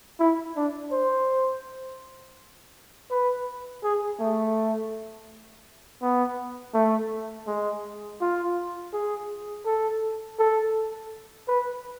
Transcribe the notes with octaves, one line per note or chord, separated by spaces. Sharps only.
E4
D4
C5
B4
G#4
A3
B3
A3
G#3
F4
G#4
A4
A4
B4